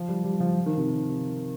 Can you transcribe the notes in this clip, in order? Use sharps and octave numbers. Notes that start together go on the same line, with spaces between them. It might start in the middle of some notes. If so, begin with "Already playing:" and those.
Already playing: F3
G3
G3
F3
D#3
C3